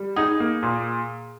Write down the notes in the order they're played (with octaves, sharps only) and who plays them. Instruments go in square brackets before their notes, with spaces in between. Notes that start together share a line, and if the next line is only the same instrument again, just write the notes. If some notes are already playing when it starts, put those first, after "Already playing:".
Already playing: [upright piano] G3
[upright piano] D#4 [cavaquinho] G#4
[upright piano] A#3
A#2